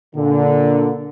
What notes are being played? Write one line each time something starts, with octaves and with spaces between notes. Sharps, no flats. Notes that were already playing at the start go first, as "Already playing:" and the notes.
A#2 D3